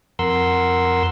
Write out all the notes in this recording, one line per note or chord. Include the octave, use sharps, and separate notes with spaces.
F2 A#4 F#5 C6 E6